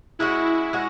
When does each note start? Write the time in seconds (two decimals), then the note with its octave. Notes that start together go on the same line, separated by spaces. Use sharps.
0.19 G#3 C#4 E4 F#4
0.73 G#3 C#4 F#4